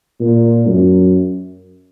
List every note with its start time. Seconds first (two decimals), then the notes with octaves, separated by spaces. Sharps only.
0.20 A#2
0.67 F#2